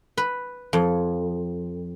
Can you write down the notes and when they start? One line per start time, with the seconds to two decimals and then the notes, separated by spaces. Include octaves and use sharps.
0.17 B4
0.73 F2